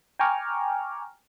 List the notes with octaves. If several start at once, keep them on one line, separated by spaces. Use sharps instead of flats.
G5 G#5 A#5 C#6 D6 F6